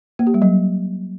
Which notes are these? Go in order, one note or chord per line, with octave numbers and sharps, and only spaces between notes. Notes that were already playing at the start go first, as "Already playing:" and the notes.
A#3
G4
G3
F#3